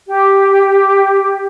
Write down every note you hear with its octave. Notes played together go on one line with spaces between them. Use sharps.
G4